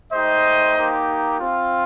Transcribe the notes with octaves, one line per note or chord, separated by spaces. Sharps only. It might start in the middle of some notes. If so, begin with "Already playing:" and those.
A3 D#4 G4 C5 D#5
A#3 D#4 G4
C4 F4